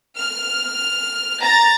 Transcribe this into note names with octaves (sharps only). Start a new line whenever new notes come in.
F6
A#5 A6